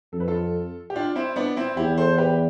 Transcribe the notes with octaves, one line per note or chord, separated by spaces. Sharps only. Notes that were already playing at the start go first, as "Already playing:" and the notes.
F2 A4
B4
F4 A4
G4
D4 F4
C4 E4
B3 D4
C4 E4
E2 E4 G4
A4 C5
G4 B4